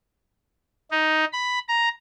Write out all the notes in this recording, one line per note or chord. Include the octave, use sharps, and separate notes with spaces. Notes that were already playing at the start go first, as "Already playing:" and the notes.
D#4
B5
A#5